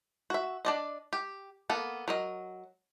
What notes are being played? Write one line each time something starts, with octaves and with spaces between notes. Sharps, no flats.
F#4 E5
D4 D5 D#5
G4
A#3 B3 A4
F#3 A#4 D#5